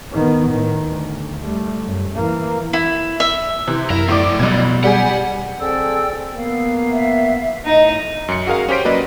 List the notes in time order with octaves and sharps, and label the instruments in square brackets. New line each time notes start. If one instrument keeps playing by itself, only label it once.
[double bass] D#3 B3
A2 D#3
D2
G3 A3
F#2
E3 A#3
[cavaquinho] E4
E5
[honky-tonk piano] C3 E3
[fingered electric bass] F#2 [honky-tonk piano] E4 [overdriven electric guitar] A#4
[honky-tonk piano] A2 D6 [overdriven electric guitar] F3 D5
[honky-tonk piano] A1 G3 G#6 [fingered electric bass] B2 F#3
[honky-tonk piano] G3 G4 G#4 [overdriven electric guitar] F#5
[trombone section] C4 G#4 A4 [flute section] D5 G5 E6
[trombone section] A#3 B3 [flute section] F5
[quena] E5
[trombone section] A2 [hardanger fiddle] D#4 [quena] D#5
[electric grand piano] F#2 C#7
F#4 G#4 A#4 F5
C#4 G4 C5 B6 D7
F#3 A#3 B4 D5 D#5